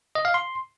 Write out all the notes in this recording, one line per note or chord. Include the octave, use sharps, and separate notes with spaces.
D#5
F5
C6